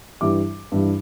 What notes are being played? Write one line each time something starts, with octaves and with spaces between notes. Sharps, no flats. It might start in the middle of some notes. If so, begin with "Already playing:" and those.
G2 E3 G3 D6
G2 E3 G3